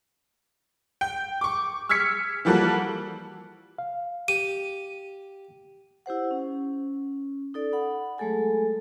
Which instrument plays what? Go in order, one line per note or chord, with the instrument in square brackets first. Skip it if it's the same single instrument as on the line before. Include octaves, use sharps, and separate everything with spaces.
[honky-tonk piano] G5
C#6 D6
E6 F6 G#6 B6 C#7
E3 F3 G3 A#3 F#4 A4
[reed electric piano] F5
[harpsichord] G4 [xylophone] D#7
[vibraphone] E4 G4 C5 F#5
C#4
D#4 A4 D5
F#5 B5
F#3 G#3 A3 G#4 A4 G#5